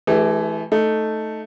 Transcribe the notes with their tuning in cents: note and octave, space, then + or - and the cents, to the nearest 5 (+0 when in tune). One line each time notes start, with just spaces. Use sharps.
E3 +0 A3 -35 G4 +25
A3 +0 D#4 +0